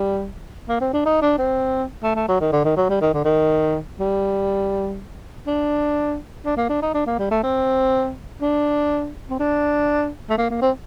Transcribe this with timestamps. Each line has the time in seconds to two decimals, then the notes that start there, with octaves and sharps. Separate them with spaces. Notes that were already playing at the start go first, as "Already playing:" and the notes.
Already playing: G3
0.69 A#3
0.81 C4
0.93 D4
1.06 D#4
1.22 D4
1.38 C4
2.03 A3
2.16 A3
2.28 F#3
2.40 D#3
2.53 D3
2.64 D#3
2.77 F#3
2.89 G3
3.01 D#3
3.14 D3
3.25 D#3
4.00 G3
5.47 D4
6.45 D4
6.57 A#3
6.69 D4
6.82 D#4
6.94 D4
7.07 A#3
7.19 G3
7.31 A3
7.43 C4
8.42 D4
9.30 C4
9.40 D4
10.29 A3
10.38 A#3
10.50 A#3
10.62 C4